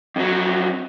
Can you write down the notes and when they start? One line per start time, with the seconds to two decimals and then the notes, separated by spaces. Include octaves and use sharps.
0.16 F2 F#3